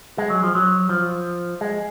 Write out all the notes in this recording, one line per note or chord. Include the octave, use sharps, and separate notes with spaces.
G#3
F#3
F3
F#3
F3
G#3